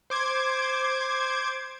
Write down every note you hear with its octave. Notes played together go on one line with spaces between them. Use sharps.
C5 D6 G#6